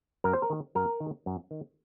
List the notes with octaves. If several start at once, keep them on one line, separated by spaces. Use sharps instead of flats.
F#2 A#4
C5
A#4
D#3
F#2 A#4
D#3
F#2
D#3